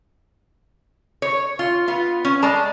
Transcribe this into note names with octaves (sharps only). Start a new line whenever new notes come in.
C#5
F4
B3 F4
C#4
G#3 D5 A5 A#5